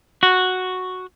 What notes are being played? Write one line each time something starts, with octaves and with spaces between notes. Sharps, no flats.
F#4